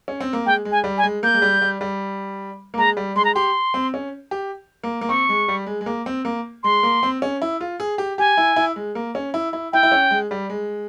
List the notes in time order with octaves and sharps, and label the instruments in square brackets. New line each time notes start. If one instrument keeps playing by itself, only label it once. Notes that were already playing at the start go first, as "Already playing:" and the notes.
[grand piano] C#4
C4
A#3
[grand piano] G#3 [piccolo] G5
[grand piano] G#3
[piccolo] G#5
[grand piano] G3
[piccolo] G#5
[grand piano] G#3
[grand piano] A#3 [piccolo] G6
[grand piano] G#3
G3
G3
G3
A#3
[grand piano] G#3 [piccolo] A#5
[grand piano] G3
[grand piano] G#3 [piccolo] C6
[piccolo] A#5
[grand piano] G4 [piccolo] C6
[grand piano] C4
C#4
G4
A#3
A#3
[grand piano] C4 [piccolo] C#6
[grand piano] G#3
G3
G#3
G#3
A#3
C4
A#3
[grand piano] G#3 [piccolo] C6
[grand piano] A#3
C4
C#4
E4
F4
G#4
G4
[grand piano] G4 [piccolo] G#5
[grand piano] E4
E4
G#3
A#3
C#4
E4
E4
[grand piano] E4 [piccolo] G5
[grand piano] E4
C#4
G#3
G3
G#3